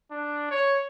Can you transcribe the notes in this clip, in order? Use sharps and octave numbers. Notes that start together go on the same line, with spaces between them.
D4
C#5